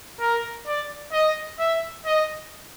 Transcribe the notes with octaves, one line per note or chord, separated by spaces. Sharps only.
A#4
D5
D#5
E5
D#5